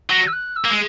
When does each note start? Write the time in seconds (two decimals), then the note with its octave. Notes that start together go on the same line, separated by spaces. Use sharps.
0.10 F#3 A#6
0.27 E6
0.32 F#6
0.56 E6
0.64 A#3
0.70 G#3